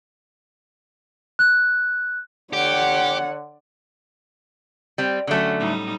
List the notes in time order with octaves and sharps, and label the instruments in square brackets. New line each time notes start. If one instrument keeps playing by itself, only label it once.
[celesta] F#6
[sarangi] D3 [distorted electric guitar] G4 [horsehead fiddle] C#5 F#5
[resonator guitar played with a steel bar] G3 C4
[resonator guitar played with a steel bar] D3 A3 [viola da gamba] F#3 C#4
[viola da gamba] A2 G3 D#4